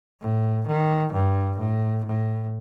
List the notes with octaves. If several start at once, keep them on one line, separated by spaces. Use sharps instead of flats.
A2
D#3
G2
A2
A2